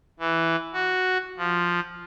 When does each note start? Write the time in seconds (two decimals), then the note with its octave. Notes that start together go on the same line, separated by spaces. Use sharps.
0.20 E3
0.73 F#4
1.38 F3